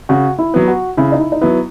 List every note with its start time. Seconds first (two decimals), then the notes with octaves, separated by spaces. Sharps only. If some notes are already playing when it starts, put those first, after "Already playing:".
0.09 C#3 F#4
0.39 E4
0.54 F#3 B3
0.68 F#4
0.97 C#3 E4
1.12 D#4
1.20 E4
1.32 D#4
1.41 F#3 B3 E4